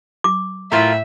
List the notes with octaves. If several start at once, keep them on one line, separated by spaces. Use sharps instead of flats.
D6
A2 E4 F4 A#4 E5